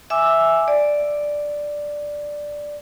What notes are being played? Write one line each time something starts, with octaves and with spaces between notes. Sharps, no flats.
E5 G#5 D6 E6
D5